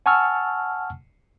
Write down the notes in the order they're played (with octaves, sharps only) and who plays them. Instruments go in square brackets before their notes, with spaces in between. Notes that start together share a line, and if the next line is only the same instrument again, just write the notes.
[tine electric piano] F#5 G#5 A5 C#6 E6 F6